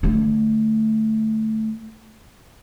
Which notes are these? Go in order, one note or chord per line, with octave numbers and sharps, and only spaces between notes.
D3 A3